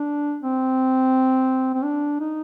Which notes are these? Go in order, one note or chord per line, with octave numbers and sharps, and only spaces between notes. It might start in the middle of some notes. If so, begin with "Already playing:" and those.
Already playing: D4
C4
C4
D4
D#4